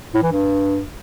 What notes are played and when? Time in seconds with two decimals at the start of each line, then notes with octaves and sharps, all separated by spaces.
0.15 A2
0.23 E3
0.31 G2